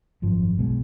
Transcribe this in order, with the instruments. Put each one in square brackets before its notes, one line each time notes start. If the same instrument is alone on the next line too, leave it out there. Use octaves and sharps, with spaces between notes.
[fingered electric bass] G#1 F#2 F3
B1 B2 G#3